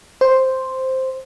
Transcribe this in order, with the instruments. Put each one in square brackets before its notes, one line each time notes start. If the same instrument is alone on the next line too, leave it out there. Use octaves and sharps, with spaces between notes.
[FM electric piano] C5